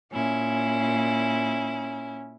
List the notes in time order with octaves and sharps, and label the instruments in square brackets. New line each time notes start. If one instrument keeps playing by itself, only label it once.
[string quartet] A#2 E4 [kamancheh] C#4